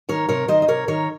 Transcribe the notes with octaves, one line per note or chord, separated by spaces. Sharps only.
D#3 A#4 C#5
C3 A#4 C#5
D#3 C5 D#5
D#5
C3 A#4 C#5
D#3 A#4 C#5